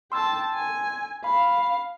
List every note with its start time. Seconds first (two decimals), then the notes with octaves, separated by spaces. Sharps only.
0.12 G5 A5 C6 E6
0.54 G#5
1.24 F5 B5